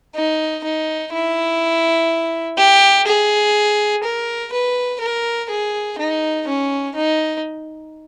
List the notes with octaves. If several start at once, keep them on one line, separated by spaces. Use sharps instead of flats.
D#4
D#4
E4
G4
G#4
A#4
B4
A#4
G#4
D#4
C#4
D#4